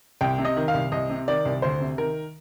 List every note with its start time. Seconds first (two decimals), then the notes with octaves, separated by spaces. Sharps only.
0.21 C2 G5
0.38 C3
0.45 D#5
0.57 D#3
0.68 F5
0.74 C2
0.92 C2 D#5
1.10 C3
1.28 D#3 D5
1.45 C2
1.62 D2 C5
1.80 C3
1.98 D#3 A#4